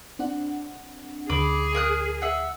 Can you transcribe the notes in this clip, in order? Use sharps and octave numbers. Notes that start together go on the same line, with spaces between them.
C4 D4 F#5
D2 D3 G#4 B5 D6
A#4 D#6 F#6
E5 F#5